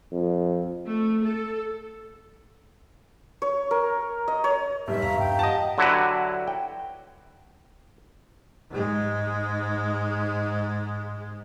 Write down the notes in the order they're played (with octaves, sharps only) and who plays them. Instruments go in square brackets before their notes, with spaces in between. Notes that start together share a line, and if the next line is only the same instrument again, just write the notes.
[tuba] F2
[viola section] A3
A4
[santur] C#5
A#4
D#5
C#5
[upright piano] F1 G3 [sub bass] G#2 [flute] E5
[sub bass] E2 [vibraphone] F5 A#5 C#6
[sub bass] G2 [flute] G5
[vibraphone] G4 F5 F#5 [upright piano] D#5 A5
[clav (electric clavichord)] D3 F#3 E4 F#4 G4 B4
G5
[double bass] G#2 G#3